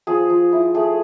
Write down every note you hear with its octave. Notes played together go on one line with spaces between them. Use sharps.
F3 G#4
F3
E4
A3 G#4